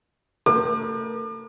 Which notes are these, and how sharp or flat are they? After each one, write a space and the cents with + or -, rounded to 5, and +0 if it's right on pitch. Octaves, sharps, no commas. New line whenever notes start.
A3 +35 A#4 +40 D6 +35